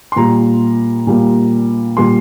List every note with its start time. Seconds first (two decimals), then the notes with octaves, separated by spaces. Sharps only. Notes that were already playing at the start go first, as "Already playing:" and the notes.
0.12 C6
0.16 A#2 G3 A#3 A#5
1.07 A#2 G3 A#3
1.97 A#2 G3 A#3 C6